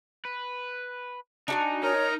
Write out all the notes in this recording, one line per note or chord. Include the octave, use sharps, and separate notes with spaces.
B4
D4 D#4 F#4 G#5
D#4 A#4 C#5 D#5 A#5